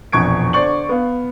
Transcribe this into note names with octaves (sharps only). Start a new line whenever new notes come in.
E1 A#1 F2 C#6 G#6 D7
D3 C5 D5 C#6 F#7
B3 F5